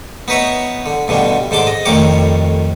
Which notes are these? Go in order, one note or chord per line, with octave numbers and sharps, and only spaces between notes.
B3 D#4 B4 C#5 E5
D3
G2 B2 D3 G3
G#2 D3 A5 C6 D6
D#5
F2 A2 D#3 G3 C#5 D6